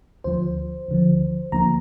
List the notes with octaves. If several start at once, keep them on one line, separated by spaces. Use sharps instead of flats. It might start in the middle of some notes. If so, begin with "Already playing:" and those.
D2 D3 F3 C5
D2 D3 F3
D2 D3 F3 A#3 A#5